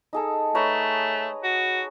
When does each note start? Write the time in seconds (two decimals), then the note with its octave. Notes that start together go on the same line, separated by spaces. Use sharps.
0.13 D#4 G#4 A4
0.55 A3 B4 C#5 A#5
1.44 F#4